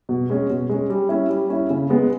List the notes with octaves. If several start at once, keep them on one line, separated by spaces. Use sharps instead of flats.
B2
G#3 C#4
B2
G#3 C#4
G3
C#4 E4
G3
C#4 E4
C#3
G#3 B3